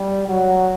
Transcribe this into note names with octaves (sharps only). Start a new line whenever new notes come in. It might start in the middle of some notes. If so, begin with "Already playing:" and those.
Already playing: G3
F#3